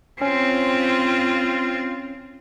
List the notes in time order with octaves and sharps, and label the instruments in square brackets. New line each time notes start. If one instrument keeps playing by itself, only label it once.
[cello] C4 F4 [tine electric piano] C#4